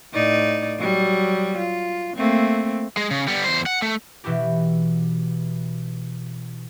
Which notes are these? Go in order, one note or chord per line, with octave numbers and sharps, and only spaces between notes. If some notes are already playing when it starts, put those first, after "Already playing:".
A2 D#4 D5
F#3 G3
F4
A3 A#3 C4
G#3
C#3
G3 B3
E2 C5
F#5
A3
B2 E3 E4 F#4 G4